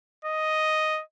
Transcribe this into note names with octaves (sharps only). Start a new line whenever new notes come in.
D#5